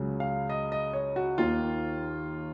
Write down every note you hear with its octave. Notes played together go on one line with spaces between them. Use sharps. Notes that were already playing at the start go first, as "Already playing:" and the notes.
Already playing: C#2 C#3 F#3
F5
D#5
D#5
C#5
F#4
D#2 D#3 A#3 F4